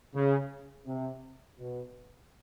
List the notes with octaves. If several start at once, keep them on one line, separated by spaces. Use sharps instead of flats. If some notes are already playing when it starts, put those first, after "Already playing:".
C#3
C3
B2